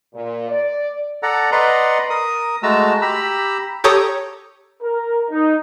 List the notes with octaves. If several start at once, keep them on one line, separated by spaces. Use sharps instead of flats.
A#2
D5
A4 D5 F#5 A#5
B4 D5 D#5 F#5 A#5 C6
A#4 D#6
G#3 A3 F#4 A5 A#5 E6
G4 A#5 B5 E6
G4 A4 C#5 A#5 D#6
A#4
D#4